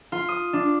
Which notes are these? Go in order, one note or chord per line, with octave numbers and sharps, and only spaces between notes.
F4
D#6
D4